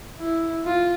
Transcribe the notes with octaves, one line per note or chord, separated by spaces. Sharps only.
E4
F4